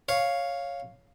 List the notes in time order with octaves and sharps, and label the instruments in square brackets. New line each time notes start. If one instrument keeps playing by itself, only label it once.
[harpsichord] C#5 F5